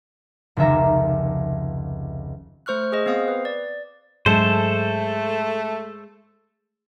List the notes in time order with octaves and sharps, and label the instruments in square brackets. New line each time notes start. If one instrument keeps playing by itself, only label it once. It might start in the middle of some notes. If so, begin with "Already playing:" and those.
[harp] F1 C#2 D#3 E5 A#5
[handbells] A3 C5 C#6 F6 F#6
G#4 C5 D#5
B3 C4 C5 F5 D#6
B4
D5
[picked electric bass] G#2 F#3 D4 [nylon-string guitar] G#3 [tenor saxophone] A3 [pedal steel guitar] A4 C5